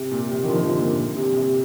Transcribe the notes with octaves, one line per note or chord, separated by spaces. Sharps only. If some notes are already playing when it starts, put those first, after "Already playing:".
Already playing: C3
A#2
C3
D#3
D3 F3
D3 F3
A#2
A#2
C3
C3